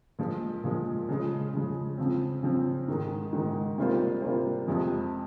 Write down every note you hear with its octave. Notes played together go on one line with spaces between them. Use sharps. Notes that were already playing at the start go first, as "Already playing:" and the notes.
A#2 F3 G#3
A#2 F3 G#3
C#3 F3 G#3
C#3 F3 G#3
C#3 F3 C4
C#3 F3 C4
G#2 D#3 G#3
G#2 D#3 G#3
C3 G3 A#3 F4 C5
C3 G3 A#3 F4 C5
F2 C3 F3 G#3